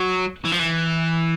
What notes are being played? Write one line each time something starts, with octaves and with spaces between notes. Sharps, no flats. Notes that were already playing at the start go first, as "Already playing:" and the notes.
Already playing: F#3
E3
F3
E3